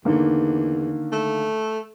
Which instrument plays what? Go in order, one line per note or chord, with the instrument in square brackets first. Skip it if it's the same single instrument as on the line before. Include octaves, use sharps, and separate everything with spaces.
[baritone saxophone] E2 [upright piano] D3 D#3 A#3
[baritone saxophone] A3